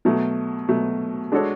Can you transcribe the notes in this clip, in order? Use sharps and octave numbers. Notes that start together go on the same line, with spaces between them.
B2 F#3 A3
B2 F#3 A3
G#3 D4 F#4 A4 C#5